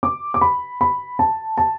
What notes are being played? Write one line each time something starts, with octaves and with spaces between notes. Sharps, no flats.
D6
D6
B5
B5
A5
A5